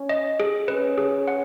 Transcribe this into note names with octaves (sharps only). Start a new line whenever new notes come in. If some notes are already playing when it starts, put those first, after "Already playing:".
Already playing: C#4
D#5
G#4
C#4 B4
G#4
F#5